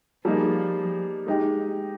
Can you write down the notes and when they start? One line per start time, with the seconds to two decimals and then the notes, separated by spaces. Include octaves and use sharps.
0.25 F3 G3 A#3 D#4 G#4
1.27 G#3 D#4 G4